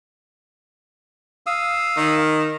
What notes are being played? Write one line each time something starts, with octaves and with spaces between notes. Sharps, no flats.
F5 D#6 E6
D#3
A#4